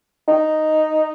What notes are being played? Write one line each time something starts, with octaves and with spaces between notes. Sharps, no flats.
D#4